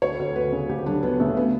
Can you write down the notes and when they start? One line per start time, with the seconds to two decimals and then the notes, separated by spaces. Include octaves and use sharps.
0.02 D2 C#5
0.19 D2
0.36 D2 B4
0.53 C#3
0.69 D2 G4
0.86 F#3 D4
1.03 D2 B3
1.20 C#3 A3
1.37 B3